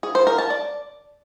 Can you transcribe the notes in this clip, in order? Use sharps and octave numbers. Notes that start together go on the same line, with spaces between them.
G#4
C5
A#4
A5
D5